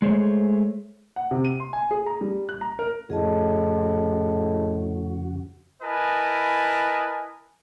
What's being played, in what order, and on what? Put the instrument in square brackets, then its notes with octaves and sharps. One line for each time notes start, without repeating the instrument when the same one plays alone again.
[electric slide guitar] G#3 A3 G#4 C5 C#5
[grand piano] F#5
C3
D#7
C6
G#5
G#4
A#5
G3
F#6
A#5
A#4
[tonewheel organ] F2 C#3 F#4 [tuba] A2 [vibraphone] G#4 D#5 A5
[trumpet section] E4 A#4 B4 D#5 G#5 A5